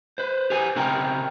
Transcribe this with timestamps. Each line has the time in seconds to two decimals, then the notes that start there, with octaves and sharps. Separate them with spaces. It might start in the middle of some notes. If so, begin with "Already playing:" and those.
0.18 B4 C5
0.50 G4 B4 G#5
0.76 B1 C#3 C4 A#4 G5 A#5